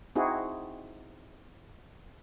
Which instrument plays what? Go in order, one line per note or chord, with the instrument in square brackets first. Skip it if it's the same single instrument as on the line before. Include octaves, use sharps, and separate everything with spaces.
[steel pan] C4 D#4 E4 F#4 G#4